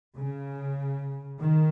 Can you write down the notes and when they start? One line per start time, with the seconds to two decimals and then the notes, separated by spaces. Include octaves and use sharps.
0.15 C#3
1.40 D#3